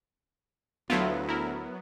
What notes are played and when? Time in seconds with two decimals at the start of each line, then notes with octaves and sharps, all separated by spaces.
0.90 D2 F#3 A3 B3 E4 F4
1.28 E4 A#4